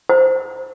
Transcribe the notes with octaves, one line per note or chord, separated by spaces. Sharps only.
C5